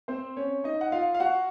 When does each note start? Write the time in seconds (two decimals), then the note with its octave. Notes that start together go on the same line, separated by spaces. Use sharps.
0.08 C4 C5
0.37 C#4 C#5
0.64 D#4 D#5
0.81 F#5
0.92 F4 F5
1.14 F5
1.20 F#4 F#5